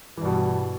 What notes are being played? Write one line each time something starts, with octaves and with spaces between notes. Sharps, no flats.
G2 B2 E3